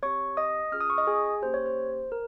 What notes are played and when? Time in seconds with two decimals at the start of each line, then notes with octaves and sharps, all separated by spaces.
0.03 C4 G4 C#5 C#6
0.37 D#5 D#6
0.72 C#4 F4 G#4 F6
0.81 D#6
0.90 C#6
0.98 D#5 D#6
1.07 G#4 G#5
1.42 A#3 C#4 G4 C5
1.54 C#5
1.66 C5
2.12 A#4